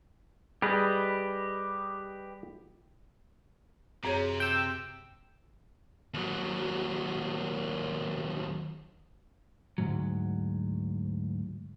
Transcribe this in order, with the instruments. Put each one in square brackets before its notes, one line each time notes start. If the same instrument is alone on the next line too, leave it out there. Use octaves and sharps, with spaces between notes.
[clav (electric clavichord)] G3 G#4 [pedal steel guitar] G4 B4 D#5
[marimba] F#2 G#4 C#5 [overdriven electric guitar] C3
[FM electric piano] G5 E6
[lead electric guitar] D#2 F#3
[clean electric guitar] D2 G#2 F#3